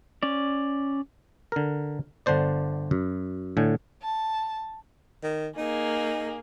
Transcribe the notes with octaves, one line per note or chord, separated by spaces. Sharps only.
C#4 D5
D3 A#4
G1 D3 D4 C5 D5
F#2
A2 D3 G#5
A5
D#3
A#3 D#4 G#4